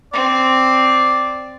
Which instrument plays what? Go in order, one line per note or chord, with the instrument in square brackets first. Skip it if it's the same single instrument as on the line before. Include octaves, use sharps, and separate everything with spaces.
[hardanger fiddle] C4 [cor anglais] D5